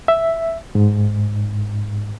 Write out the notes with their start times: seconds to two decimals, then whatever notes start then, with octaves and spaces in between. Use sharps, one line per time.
0.08 E5
0.75 G#2